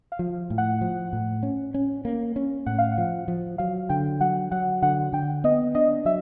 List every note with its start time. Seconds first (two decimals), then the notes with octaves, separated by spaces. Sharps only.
0.12 F5
0.19 F3
0.50 A2
0.58 F#5
0.81 F3
1.13 A2
1.43 C#4
1.74 C#4
2.05 A#3
2.36 C#4
2.66 A2 F#5
2.78 F5
2.92 F#5
2.98 F3
3.28 F3
3.58 F#3 F5
3.89 D3 G5
4.21 F#3 F#5
4.51 F#3 F#5
4.82 D3 F#5
5.13 D3 G5
5.44 B3 D#5
5.75 D4 D#5
6.05 F#3 E5